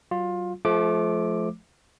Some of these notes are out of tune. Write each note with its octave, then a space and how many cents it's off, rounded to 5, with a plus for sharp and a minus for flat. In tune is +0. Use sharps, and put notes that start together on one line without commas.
F#3 +30 F4 +20
F3 +0 A3 -30 D6 +5